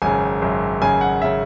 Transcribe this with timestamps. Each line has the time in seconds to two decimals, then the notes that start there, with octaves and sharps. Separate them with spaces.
0.02 G#1 F#2 C#3 G#5
0.42 G#1 F#2 C#3
0.81 G#1 F#2 C#3 G#5
1.01 F#5
1.22 C#3 E5